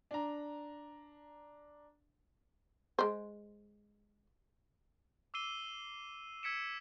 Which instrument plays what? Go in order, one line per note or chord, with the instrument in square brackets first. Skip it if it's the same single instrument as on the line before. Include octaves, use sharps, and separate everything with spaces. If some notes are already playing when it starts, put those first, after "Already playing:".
[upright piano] D4 A#5
[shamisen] G#3 C5
[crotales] D6 E6 C7 D#7 G7
E6 G#6 B6 C#7 D7 E7